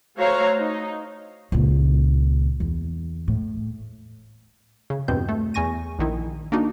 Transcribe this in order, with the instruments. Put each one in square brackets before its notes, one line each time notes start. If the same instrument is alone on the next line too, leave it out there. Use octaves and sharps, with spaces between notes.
[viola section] A3 F#4 C5 C#5 F5 A#5
D#4
[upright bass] C#2 A#2
E2
A2
[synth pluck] C#3
E2 G2 B2 C4 G6
A3
E2 G#5 C#6 A#6 D#7
A#1 D#3 E4
A#3 D4 D#4 F#4